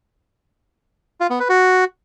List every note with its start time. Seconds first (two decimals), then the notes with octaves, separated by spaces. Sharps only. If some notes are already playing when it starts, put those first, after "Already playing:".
1.20 F4
1.30 B3
1.40 B4
1.49 F#4